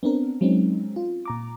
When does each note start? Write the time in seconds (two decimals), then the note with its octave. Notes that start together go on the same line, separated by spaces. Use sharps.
0.03 B3 C4 D4 A#4
0.41 F#3 G#3 C4 C#4 D#4
0.96 F4
1.25 A#2 A#5 D6